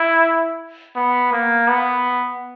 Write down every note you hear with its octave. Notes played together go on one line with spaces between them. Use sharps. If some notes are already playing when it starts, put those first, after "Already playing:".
Already playing: E4
B3
A#3
B3